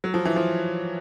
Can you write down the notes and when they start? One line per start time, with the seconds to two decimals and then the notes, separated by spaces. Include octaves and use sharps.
0.04 F#3
0.14 F3
0.25 E3
0.36 F3